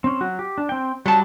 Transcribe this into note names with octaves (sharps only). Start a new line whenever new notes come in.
C4 C#4
F#3 F#4
G4
D4
C4 G5
F#3 G3 A5